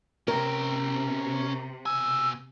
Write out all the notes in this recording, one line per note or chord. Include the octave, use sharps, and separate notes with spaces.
C3 C#4 A#4 G5
B2 G#5 E6